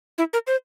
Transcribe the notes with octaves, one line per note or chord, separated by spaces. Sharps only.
E4
A#4
C5